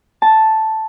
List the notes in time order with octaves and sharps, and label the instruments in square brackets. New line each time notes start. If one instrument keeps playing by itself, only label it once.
[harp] A5